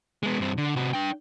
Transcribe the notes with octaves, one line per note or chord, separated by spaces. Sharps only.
G#3 B3
G2 C4
D3
C3 F#4
D4 G5